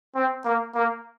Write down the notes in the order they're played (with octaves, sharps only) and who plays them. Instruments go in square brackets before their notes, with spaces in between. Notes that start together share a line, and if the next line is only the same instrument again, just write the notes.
[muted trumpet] C4
A#3
A#3